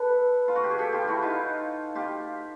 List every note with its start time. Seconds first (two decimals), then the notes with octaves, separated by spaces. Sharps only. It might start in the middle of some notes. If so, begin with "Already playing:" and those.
Already playing: A4 B4
0.48 F4
0.55 F#4
0.64 G4
0.71 G#4
0.78 G4 A4
0.93 F4 G4
1.08 E4 F#4
1.22 D#4 F4
1.95 F4 G4